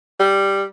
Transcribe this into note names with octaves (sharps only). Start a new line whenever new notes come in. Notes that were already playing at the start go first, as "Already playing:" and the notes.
G3